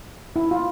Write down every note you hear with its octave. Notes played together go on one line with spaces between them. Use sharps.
E4
F4